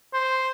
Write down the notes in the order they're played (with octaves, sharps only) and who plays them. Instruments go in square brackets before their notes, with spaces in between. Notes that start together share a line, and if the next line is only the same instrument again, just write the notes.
[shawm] C5